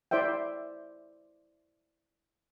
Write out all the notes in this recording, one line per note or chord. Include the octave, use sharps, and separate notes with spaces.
E4 C5 D5 E5 G5